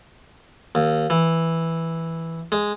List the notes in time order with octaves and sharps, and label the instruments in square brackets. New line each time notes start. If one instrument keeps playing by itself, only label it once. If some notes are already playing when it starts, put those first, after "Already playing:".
[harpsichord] D#2
E3
G#3